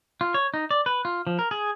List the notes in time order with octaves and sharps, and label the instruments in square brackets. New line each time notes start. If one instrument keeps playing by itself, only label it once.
[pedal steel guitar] F4
C#5
D#4
D5
B4
F4
F3
A#4
G#4